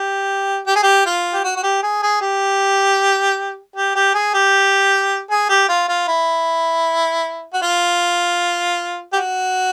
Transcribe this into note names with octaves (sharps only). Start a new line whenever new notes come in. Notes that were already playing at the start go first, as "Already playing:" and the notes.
Already playing: G4
G4
G#4
G4
F4
G4
F#4
F#4
G4
G#4
G#4
G4
G4
G4
G#4
G4
G#4
G4
F4
F4
E4
F#4
F4
G4
F#4